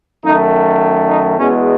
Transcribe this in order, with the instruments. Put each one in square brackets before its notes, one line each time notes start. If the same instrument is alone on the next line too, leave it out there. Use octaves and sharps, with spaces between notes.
[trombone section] F#2 D#3 A3 D#4
D#4
E2 B2 G#3 C#4